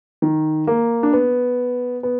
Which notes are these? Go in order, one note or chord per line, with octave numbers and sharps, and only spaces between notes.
D#3
A#3
D4
B3
B3